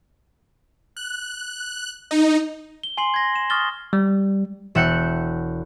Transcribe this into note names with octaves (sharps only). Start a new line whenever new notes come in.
F#6
D#4
G7
G#5 C6 C7 F#7
G#6 A#6
E7
C#6 D#6 F6 A6 G7
G3
E1 E5 F#5 G6 C#7